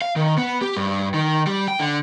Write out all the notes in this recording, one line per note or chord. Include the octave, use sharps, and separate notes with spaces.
F5
D#3
B3
G4
G2
D#3
G3
G5
D3